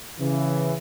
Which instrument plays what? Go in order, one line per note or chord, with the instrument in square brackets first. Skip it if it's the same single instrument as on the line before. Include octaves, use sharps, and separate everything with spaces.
[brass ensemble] C#3 E3